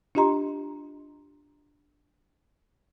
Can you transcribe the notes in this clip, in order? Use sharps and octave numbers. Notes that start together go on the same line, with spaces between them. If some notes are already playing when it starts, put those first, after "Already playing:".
D4 F4 G4 D#5 A#5 C6